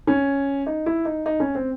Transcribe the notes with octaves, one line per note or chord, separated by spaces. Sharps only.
C#4
D#4
E4
D#4
D#4
C#4
C4